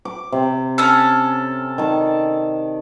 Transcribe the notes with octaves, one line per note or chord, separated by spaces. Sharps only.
D6
C3 G4
C#4 A4
D#3 D5 A5